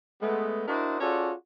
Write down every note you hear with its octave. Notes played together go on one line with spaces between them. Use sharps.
G#3 A3 B3
D4 E4 F#4 A#4 C5 D#5
C#4 F4 F#4 G#4 A4 D5